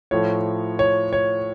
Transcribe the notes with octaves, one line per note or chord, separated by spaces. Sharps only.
A2 F3 C#5
C#5
C#5